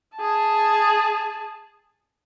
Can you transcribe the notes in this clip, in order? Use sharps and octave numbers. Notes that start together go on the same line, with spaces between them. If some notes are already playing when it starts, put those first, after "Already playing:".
G#4 A5